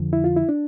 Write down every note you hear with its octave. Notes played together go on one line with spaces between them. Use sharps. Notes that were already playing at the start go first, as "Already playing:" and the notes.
Already playing: F2 D3 F3
E4
F4
E4
D4